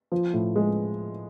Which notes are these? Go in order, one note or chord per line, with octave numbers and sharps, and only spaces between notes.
F3
A2
G#3